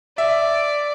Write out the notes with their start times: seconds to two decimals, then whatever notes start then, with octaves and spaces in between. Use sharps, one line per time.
0.18 D5 E5